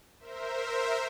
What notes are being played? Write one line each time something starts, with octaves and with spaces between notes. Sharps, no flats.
A#4 C5 E5